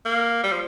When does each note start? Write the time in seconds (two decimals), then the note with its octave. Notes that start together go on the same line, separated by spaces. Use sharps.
0.05 A#3
0.44 G3
0.52 F3